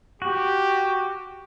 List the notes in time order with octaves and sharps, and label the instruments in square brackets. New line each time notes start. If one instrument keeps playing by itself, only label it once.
[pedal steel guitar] F#4 [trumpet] G4